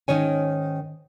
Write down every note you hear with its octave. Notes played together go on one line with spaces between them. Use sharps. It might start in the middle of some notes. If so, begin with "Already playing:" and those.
G#2 D#3 C#4 C#5 G#5